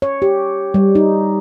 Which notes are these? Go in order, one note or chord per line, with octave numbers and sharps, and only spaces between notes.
C#5
G4
G3
D#4